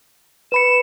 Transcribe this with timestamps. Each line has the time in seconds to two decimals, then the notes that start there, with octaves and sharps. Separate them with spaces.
0.52 B4 B5 C#7 E7